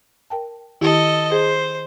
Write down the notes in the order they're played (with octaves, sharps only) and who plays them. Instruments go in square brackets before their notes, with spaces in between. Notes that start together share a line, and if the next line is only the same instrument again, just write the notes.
[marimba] A#4 G5 A5
[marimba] D#3 E4 G4 [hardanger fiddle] A4 D#5
[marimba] G#4 [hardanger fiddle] C5